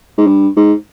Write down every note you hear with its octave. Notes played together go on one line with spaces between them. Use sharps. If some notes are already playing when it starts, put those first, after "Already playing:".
G#2
G2
G#2